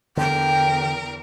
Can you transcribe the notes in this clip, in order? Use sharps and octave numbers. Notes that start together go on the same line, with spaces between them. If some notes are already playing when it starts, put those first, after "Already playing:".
E2 D3 A#4 G5